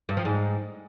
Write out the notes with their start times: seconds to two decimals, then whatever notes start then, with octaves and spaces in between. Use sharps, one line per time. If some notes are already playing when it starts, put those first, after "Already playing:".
0.09 G2
0.17 F3
0.25 G#2